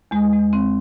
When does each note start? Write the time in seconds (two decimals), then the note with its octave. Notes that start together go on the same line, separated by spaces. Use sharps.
0.11 E2 G#3
0.33 G#3
0.39 E2
0.53 C4